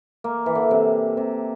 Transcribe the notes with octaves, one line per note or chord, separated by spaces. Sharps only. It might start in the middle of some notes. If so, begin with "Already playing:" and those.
A#3
E3
D3
C3
C3